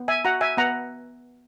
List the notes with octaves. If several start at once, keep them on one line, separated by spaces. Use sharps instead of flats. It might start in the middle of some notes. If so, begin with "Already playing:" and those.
Already playing: B3
E5 G#5
F#4 F#5 A#5
E5 G#5
B3 F#5 A#5